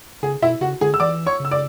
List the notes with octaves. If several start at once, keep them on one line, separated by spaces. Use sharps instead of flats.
C#3 G#4
B2 E4 E5
C#3 F#4 F#5
D3 G#4 G#5
E6
E3 D5 D6
C#5 C#6
C#3
E6
D5 D6